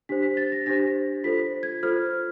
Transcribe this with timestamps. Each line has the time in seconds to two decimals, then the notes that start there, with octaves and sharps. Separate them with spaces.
0.09 D4 G4 C5 B6
0.22 B6
0.37 A6
0.52 A#6
0.66 D4 G4 C5 A#6
1.24 F4 A4 C5 B6
1.63 G#6
1.83 F4 A4 C5 F6